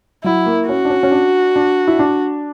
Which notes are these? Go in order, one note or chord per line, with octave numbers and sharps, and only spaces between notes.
F#3 E4
A#3
C#4 F#4
D4
C#4
C#4
D4
D4
E4
D4